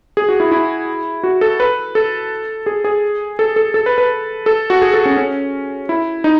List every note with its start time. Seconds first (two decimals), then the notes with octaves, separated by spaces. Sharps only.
0.17 G#4
0.29 F#4
0.40 E4
0.52 E4
1.24 F#4
1.41 A4
1.60 B4
1.95 A4
2.66 G#4
2.84 G#4
3.39 A4
3.56 A4
3.74 A4
3.86 B4
3.98 B4
4.46 A4
4.70 F#4
4.82 G#4
4.94 A4
5.05 C#4
5.17 C#4
5.89 E4
6.24 D#4